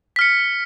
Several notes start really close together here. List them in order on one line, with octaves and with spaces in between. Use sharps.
B6 F6 C#7